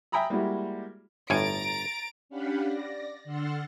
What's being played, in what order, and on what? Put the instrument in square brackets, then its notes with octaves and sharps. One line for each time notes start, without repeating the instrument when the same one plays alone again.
[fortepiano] E5 G5 G#5 A#5 B5 D#6
G3 G#3 A#3 E4 F#4 G4
[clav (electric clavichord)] G1 A2 G#5 [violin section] A#5 A6 D7
[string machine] C#4 D4 G4 F5 F#5 B5
D5 A#6
D3 F#5 C6 E6 F6 A6